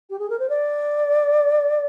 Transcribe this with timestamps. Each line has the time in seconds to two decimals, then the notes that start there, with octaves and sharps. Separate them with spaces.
0.10 G4
0.19 G#4
0.30 A#4
0.39 C5
0.49 D5